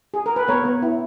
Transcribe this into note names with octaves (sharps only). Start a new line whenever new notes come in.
G#4
A#4
B4
B3 A#4 C#5
B3
E4